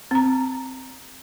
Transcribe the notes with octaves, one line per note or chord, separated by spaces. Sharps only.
C4 A#5